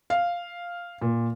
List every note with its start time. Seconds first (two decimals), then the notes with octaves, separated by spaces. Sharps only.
0.10 F5
1.02 A#2